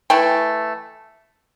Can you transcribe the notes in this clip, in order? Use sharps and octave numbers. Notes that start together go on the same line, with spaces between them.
E3 A3 G5